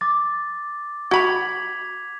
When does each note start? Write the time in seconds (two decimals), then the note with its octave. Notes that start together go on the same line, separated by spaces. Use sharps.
0.01 D6 A6
1.11 F#4 B5 G#6 B6 F7